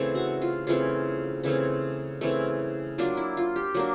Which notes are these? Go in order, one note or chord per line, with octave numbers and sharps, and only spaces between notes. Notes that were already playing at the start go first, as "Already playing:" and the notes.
Already playing: C#3 E3 A3 C4
F#4
F4
C#3 E3 A3 C4 F4
C#3 E3 A3 C4
C#3 E3 A3 C4
F#3 A#3 D4 F4
E4
F4
G4
F#3 A#3 D4